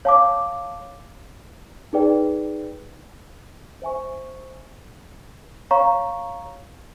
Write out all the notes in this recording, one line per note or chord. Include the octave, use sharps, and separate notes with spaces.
C#5 F5 A5 D6
D#4 G#4 B4 D5 G5
C5 E5 G#5 C#6
C#5 F5 A#5 C#6